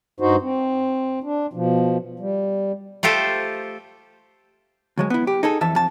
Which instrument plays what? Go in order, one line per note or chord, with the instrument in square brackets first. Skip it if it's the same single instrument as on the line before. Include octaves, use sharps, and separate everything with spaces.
[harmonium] G2 D#4 F#4 C5
C4
D4
B2 F3
G3
[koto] A3 F4 G4 A4 C5
[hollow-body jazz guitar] D2 F#3 G#3
B3 E4
G4
D#4 G#4 A4
F2 E3 E5 A5
F2 A5